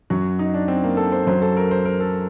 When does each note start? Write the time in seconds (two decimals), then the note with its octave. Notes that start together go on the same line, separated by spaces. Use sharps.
0.10 F#2 F#3 F#4
0.39 D#4
0.54 D4
0.68 C4
0.84 A#3
0.97 A4
1.12 C5
1.27 F#2 F#3 C5
1.42 A4
1.57 A#4
1.71 C5
1.85 A#4
2.00 A4